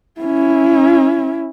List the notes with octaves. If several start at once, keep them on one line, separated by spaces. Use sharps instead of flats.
C#4 E4